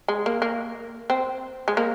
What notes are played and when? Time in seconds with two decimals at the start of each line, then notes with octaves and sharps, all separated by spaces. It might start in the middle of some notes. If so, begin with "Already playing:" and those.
0.08 G#3
0.26 A#3
0.42 A#3
1.10 C4
1.68 G#3
1.77 A#3